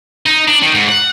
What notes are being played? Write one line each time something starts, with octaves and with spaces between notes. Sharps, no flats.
D#4
D4
D#3
G#2
F#5